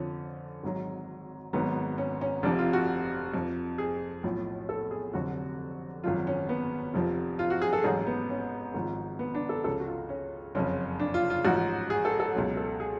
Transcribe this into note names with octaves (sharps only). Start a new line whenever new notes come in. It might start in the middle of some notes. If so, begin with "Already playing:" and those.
Already playing: F2 D3 F3 C#4
G#1 G#2 F#3
G#1 G#2 F#3 B3
C#4
C#4
F1 F2 F3 D4
F4
F#4
F2 F3
G#4
B1 A2 F3
A4
G#4
F1 F2 D3 F#3 F#4
G#1 F#2 F3 F4
C#4
B3
F1 F2 F3
F4
F#4
G#4
A4
A1 G#2 F#3 G#4
B3
C#4
G#1 G#2 F3
B3
D4
A4
C#2 C#3 F3 A4
F#4
F4
C#4
F#1 F2 C#3 C#4
D4
F4
F4
A1 G#2 F3 F#4
G#4
A4
A4
C#2 B2 F#3
A4
G#4